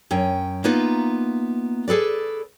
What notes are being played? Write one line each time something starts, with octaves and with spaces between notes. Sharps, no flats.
F#2 C#4 G5
A#3 B3 D#4 F4 B4 E5
G#4 A4 B4 D5